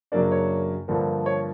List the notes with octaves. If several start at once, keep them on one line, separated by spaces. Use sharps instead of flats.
F#2 C#3 F#3 A#3 D4 D5
C#5
G2 D3 F3 A#3
C#5